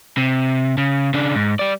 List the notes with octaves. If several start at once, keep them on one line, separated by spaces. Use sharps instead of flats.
C3
C#3
C#3 D4
G#2
G3 D5